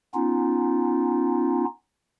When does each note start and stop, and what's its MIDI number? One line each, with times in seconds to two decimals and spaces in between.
0.14 1.65 59
0.14 1.65 61
0.14 1.65 63
0.14 1.65 65